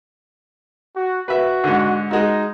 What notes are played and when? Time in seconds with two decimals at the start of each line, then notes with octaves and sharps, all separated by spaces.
0.96 F#4
1.28 F#4 B4 E5
1.64 G#2 D3
2.11 G#3 D#4 F#4